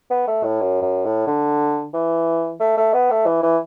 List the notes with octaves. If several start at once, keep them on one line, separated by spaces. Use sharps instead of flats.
B3
A3
A2
F#2
F#2
A2
D3
E3
A3
A3
B3
A3
E3
E3